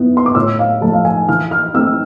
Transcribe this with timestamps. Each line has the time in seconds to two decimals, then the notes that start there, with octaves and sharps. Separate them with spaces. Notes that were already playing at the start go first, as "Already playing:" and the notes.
Already playing: B3 E4
0.17 C6
0.26 D6
0.35 A2 E6
0.59 F5
0.81 F3 A3 A5
0.93 F5
1.05 G#5
1.29 E3 F6
1.51 F6
1.74 A3 C4 E4 E6